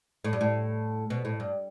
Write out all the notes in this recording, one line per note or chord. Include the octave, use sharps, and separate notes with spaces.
A2
G2
A2
B2
A2
G2